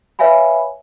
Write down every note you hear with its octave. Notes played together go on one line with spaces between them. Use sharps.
B4 C#5 E5 F5 G#5 B5